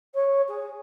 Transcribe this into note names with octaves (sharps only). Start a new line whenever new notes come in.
C#5
G#4